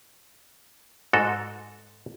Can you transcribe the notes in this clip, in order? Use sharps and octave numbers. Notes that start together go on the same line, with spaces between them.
G#2 F#4 A4